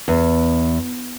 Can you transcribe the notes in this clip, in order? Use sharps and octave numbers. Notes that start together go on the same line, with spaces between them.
E2